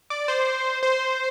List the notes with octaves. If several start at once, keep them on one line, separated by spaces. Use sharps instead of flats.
D5
C5
C5